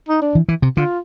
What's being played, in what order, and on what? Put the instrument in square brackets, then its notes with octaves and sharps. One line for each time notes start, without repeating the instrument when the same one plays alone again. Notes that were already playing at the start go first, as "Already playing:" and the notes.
[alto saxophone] D#4
D4
[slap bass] E3
E3
C3
[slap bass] D3 [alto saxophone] F4